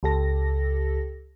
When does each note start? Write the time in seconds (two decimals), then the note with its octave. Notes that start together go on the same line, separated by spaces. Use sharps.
0.03 C#2 G4 A4 A#6